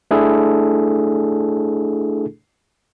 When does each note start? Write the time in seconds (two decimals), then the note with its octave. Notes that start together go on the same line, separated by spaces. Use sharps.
0.11 A3 D4 E4 G#4 A4